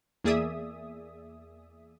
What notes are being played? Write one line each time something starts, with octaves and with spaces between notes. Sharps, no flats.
E2 A#3 G#4 D5 E5 D#6